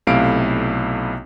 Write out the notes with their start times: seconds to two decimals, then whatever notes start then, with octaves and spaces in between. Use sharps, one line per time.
0.07 B1 C3 A3 E4 F5 D7